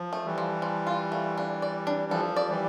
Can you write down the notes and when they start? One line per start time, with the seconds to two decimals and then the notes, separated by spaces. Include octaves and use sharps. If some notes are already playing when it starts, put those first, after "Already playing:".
Already playing: F3
0.13 A3
0.25 E3 G3
0.38 F3
0.62 F3
0.87 F4
1.12 A3
1.38 D4
1.62 D5
1.87 D4
2.11 F3 A4
2.36 D5
2.49 E3 G3